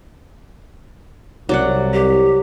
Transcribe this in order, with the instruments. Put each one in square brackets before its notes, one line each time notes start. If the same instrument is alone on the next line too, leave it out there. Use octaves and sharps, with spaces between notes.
[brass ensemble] C2 [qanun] F#3 D5 F#5
[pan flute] G4